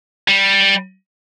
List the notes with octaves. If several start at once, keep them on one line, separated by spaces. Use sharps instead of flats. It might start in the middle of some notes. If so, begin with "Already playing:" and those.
G3